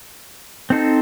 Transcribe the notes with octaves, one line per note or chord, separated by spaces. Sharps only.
C4 D#4 A4 C5